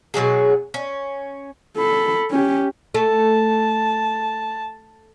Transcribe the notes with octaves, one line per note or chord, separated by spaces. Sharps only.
B2 F#3 G#3 G#4
C#4
A4 B5
C#4 G4
A3 A5